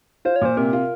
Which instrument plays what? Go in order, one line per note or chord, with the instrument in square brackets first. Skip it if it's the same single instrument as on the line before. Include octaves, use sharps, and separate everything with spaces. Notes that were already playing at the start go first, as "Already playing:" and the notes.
[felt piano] F4 [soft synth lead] C5
[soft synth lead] C#5
[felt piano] A#2 [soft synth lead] C5
[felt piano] C3 [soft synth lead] A#4
[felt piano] F4